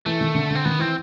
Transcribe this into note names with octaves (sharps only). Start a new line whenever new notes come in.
E3 A3
D#3
D3
D3 C4
D#3 B3
E3 C4